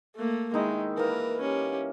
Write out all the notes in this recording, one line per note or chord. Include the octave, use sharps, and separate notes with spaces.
A3 A#3
D#3 G#3 D#4 E4
E3 A#3 A#4 B4
C#4 G4